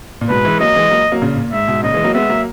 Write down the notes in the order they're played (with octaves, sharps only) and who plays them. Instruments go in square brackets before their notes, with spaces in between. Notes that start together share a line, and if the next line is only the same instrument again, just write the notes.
[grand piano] A#2
[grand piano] G#2 B2 [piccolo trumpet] B4
[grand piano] E3 G#3
[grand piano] F#3 A#3 [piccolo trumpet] D#5
[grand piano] E3 G#3
F#3 A#3
F#3 A#3
A#2 C#3
A#2
[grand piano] G#2 [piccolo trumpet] E5
[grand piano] G#2 B2
[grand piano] A#2 C#3 [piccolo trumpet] D#5
[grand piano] E3 G#3
F#3 A#3
[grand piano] G#3 B3 [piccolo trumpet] E5
[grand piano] F#3 A#3